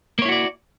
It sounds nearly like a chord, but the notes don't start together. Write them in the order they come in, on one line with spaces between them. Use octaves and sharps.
A#3 C#5 E4 F#4 D5